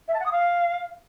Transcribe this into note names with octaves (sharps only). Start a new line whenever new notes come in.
E5
A5
F#5
D#6
F5